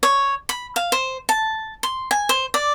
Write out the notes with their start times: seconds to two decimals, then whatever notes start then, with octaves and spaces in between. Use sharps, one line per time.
0.03 C#5
0.49 B5
0.76 F5
0.92 C5
1.29 A5
1.83 C6
2.11 G#5
2.29 C5
2.54 D5